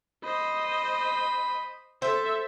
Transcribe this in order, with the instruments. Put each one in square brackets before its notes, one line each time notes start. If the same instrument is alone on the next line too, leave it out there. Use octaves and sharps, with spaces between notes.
[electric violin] C5 D#5 [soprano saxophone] B5
[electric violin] A4 E5 [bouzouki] C5